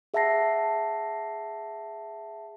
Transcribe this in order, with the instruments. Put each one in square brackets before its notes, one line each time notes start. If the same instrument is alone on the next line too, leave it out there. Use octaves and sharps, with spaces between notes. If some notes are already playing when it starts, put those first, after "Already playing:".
[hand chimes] G#4 E5 F#5 A5 A#6 C7